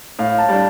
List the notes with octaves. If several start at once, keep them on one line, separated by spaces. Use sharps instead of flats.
A2 F5
A5
G3 D4